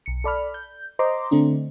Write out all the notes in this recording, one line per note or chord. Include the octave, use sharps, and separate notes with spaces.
B1 C#7
A4 D5 B5 F6
G6
C5 D#5 A#5 C6 D6
D3 A3 C4 D4